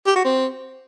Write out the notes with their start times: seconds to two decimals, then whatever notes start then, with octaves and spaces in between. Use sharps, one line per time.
0.07 G4
0.16 F#4
0.25 C4